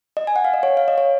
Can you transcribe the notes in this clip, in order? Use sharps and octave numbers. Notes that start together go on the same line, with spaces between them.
D#5
G#5
F#5
F5
D#5
C#5
F5
D#5
C#5